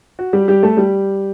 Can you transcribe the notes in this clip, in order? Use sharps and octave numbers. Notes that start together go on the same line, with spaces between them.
F#4
G3 G4
G3 G4
A3 A4
G3 G4